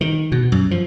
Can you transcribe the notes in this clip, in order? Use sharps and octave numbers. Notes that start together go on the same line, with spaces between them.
D#3
B2
F#2
F3